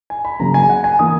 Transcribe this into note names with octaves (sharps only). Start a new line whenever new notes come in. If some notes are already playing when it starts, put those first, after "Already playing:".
G#5
B5
C#3 F#3 A#3 A#5
G#5
F#5
G#5
E3 A#3 D#6